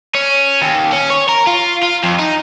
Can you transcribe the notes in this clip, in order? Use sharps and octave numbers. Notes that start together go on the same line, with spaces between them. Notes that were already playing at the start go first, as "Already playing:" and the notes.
C#4
D#2
C#4
C#5
A#4
F4
F4
F2
D#4